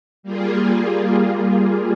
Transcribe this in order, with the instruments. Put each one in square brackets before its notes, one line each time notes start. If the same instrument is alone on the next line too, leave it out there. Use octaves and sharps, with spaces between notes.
[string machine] G3 A#3 F4 G#4